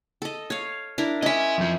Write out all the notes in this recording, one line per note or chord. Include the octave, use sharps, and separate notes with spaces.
A4 D#5
C#5 F5
D4 E4 A#4
C#4 D#5 E5 G#5
F2 F3